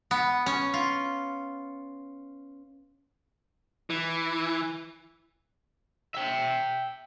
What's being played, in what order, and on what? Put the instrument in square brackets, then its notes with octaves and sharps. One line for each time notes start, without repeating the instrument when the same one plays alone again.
[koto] B3
C#4
F4
[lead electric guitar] E3
[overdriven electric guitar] E5 G5